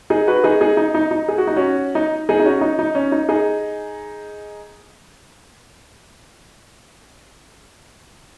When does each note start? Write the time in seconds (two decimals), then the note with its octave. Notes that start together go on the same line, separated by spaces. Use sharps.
0.10 D#4 G#4
0.27 F#4 B4
0.44 D#4 G#4
0.61 D#4 G#4
0.77 D#4
0.95 D#4
1.11 D#4
1.28 G#4
1.38 F#4
1.47 D#4
1.56 C#4 F#4
1.95 D#4
2.29 D#4 G#4
2.40 D#4
2.45 C#4 F#4
2.61 D#4
2.79 D#4
2.95 C#4
3.12 D#4
3.29 D#4 G#4